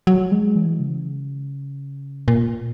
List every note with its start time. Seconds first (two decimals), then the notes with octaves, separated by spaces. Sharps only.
0.07 F#3
0.32 G#3
0.56 E3
0.80 C#3
2.28 A#2